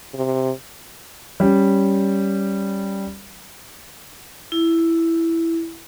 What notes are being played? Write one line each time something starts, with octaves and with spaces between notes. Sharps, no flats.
C3
G3 C#4
E4